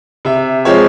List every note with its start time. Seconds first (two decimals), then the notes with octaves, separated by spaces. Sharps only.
0.25 C3 E5
0.65 F3 G#3 C4 C#5